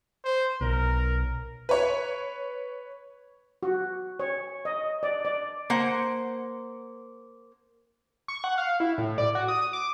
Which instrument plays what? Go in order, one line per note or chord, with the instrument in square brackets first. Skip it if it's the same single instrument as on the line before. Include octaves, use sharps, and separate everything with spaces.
[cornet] C5
[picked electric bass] B1 [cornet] A#4
[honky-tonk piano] B4 C#5
[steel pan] F#4
C#5
D#5
D5
D5
[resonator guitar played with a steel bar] A#3 C5 F#5
[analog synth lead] C#6
F#5
F5
E4
A2
D5
F#4
D#6
D6